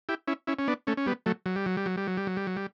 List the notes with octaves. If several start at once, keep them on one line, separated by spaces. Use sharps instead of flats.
E4 G4
C#4 E4
C#4 E4
C#4
B3 D4
A3 C#4
C#4
G3 B3
F#3 A3
F#3
G3
F#3
G3
F#3
G3
F#3
G3
F#3
G3
F#3
G3